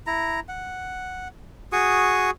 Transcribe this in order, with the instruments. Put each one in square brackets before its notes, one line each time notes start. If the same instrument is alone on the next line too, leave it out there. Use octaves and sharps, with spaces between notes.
[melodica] E4 A#5
F#5
F#4 G#4 C#6 D#6